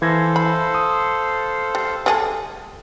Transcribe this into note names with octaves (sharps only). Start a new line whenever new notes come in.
E3 A4 C5 F5 G#6 A#6
B5
D#6
G3
G3 G#4 A4